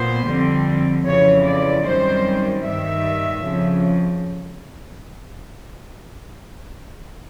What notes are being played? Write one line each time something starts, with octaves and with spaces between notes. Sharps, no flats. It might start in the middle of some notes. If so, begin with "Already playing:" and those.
Already playing: A#2 B3 C5
F2 D3 G3 C4
F2 C#3 E3 C#5
D5
F#2 D#3 G3 C4 C5
G2 D#3 G3 E5
F2 C#3 F3